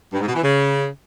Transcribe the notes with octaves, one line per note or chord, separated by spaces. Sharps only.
G2
G#2
B2
E3
C#3